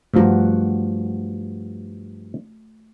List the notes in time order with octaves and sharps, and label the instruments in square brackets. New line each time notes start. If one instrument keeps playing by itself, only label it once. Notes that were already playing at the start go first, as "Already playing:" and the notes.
[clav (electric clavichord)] G2 F3 A#5 [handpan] A3 F#4